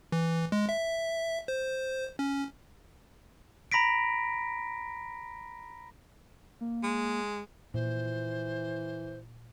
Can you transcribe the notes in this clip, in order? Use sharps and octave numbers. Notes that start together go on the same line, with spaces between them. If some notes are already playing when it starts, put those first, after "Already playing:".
E3
G#3
E5
C5
C#4
A#5 B5 A#6 B6 D7
A#3
G#3
A#2 E3 C5